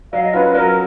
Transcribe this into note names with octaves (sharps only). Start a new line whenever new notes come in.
F#3 F5
D#5
C#4 F4 B4
B4
F#3 A#4